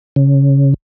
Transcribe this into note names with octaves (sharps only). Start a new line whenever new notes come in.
C#3